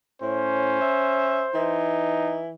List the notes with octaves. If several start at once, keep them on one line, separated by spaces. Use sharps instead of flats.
A2 C#4 C5
E5
E3 D#4